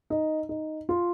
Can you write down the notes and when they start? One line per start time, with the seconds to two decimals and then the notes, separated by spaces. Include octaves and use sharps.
0.10 D#4
0.49 D#4
0.89 F4